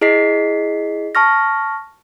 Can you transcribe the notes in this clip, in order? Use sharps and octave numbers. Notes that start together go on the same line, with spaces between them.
E4 G#4 D#5 B6 C7
A5 C#6 F6 A#6